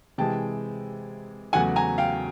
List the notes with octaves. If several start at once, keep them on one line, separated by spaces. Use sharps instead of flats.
C3 E3 G#3 G5 A5
E2 C#3 F#3 A3 F#5 G#5
G#5 A#5
F5 G5